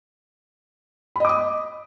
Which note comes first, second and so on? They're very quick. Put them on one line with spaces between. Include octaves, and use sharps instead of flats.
B5 D#5 D6 D#6